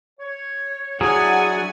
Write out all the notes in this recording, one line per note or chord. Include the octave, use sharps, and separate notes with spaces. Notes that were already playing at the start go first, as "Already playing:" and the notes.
C#5
F#3 D4 E4 G#4 F#5 G#5